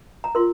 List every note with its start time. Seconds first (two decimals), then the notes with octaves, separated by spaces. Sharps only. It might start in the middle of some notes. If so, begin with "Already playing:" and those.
0.24 A#5
0.35 F4 A#4 C6